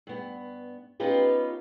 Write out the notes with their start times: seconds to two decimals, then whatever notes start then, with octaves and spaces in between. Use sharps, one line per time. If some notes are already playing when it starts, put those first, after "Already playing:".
0.07 G2 B3
1.00 B3 C#4 D#4 F4 G4 B4